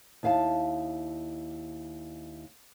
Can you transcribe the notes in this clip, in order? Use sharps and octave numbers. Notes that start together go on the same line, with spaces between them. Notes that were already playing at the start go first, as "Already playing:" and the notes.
D#2 E4 F5 G#5 A5